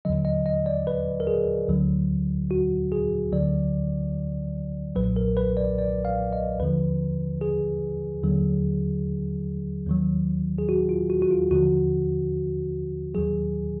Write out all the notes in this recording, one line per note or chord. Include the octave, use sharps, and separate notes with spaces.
D#2 D3 F#3 D#5
D#5
D#5
D5
B4
A#4
G#4
D2 D3 F#3
F#4
G#4
D2 D3 F#3 D5
B1 A#2 F#3 B4
A#4
B4
D5
D5
F5
D#5
D#2 D3 F3 B4
G#4
D#2 D3 F#3
D#2 D#3 F#3
G#4
F#4
F4
F#4
F#4
F4
D#2 D3 F3 F#4
D#2 D#3 F#3 G#4